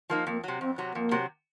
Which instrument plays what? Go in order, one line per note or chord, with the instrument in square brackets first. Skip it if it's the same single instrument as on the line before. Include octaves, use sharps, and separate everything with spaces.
[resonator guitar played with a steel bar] F3 A#3 D#4
[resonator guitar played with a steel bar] F2 [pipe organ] A#3
[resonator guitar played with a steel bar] C3 F#3
[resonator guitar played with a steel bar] F2 [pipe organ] C4
[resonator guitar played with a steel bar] C3 F#3
[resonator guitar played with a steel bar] F2 [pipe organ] A#3
[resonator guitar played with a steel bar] C3 F#3